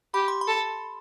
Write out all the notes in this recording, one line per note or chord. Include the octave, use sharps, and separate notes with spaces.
G4 B5
C6
B5
A4